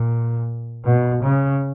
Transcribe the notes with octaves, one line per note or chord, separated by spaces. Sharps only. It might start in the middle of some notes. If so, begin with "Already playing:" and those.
Already playing: A#2
B2
C#3